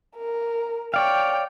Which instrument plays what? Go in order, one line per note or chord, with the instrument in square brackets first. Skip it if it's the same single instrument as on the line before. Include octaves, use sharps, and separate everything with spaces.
[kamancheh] A#4
[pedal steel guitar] C#5 D5 F5 [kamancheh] G5